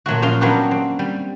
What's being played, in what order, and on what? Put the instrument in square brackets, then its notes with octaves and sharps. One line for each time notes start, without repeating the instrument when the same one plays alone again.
[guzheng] A#2 F#3 A3 F#4
F3 C#4 F4 F5 C6
F#3 A#3 B3 C#4 D4 G4
C4
G3